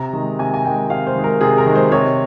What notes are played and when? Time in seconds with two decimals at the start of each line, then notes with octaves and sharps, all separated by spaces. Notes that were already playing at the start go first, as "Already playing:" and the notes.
Already playing: C3 A#5
0.13 D#3 G#3
0.39 C3 G#5
0.54 G#5
0.65 D#3 G#3 G5
0.90 C3 F5
1.07 C5
1.15 D#3 G#3
1.24 A#4
1.41 C3 G#4
1.58 A#4
1.66 D#3 G#3
1.76 C5
1.91 C3 C#5